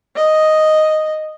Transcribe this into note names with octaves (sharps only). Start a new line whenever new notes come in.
D#5